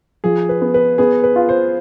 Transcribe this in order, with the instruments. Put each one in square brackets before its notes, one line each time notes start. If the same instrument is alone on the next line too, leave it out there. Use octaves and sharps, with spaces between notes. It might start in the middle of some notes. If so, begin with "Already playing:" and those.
[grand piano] F3 [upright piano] G#4
[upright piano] B4
[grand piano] B3
[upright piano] B4
[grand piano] B3 [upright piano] G#4
[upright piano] B4
[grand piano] F4
[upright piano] C5